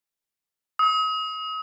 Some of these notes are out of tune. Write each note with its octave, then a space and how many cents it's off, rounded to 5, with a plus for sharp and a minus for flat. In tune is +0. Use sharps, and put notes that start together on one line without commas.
D#6 +40